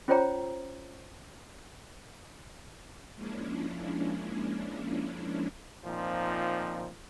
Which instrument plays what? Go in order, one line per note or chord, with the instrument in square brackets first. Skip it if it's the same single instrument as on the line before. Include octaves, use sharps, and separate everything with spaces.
[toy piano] C#4 F4 C5 C#5 G5 A#5
[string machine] F3 G#3 A#3 C#4 D4 E4
[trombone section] A#2 F3 C4 D#4